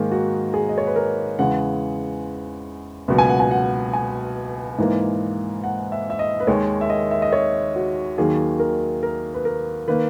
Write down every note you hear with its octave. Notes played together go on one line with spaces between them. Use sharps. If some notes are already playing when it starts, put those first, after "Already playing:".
Already playing: G#2 D#3 A#3 G#4
F#4
G#4
D#5
C#5
B4
A#4
E2 C#3 G#3 F#5
C#2 B2 F#3 A#3
G#5
F#5
G#5
F#5
G#5
G#2 E3 A#3
F#5
E5
E5
D#5
B4
D#2 D#3 G#3 C#5
E5
D#5
E5
D#5
C#5
F#4
D#2 D#3 F#3 A#3 G#4
A#4
A#4
B4
A#4
D#3 A#3 B4